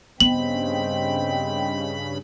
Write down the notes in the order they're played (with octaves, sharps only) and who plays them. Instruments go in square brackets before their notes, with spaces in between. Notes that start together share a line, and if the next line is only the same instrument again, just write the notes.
[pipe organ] G2 C#3 B5 [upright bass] B3 [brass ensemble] C4 D#5 G5 [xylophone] F#7